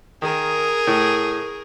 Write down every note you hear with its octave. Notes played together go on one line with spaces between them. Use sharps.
D#3 G#4 A#4
A2